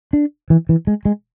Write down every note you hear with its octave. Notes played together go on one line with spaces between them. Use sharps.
D4
E3
E3
G#3
G#3